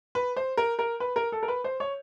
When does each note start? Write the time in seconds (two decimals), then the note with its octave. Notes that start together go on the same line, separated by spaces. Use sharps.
0.15 B4
0.36 C5
0.57 A#4
0.79 A#4
1.00 B4
1.16 A#4
1.32 A4
1.43 A#4
1.48 B4
1.64 C5
1.80 C#5